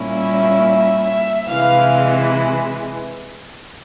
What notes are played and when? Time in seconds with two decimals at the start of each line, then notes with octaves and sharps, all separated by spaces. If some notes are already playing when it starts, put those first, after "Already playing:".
Already playing: A#2 G3 A#3 C#4 E4
0.17 E5
1.06 E5
1.50 C3 E3 G#3 F5